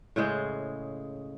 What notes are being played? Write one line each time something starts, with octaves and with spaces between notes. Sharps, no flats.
A2 C#3 G#3 C5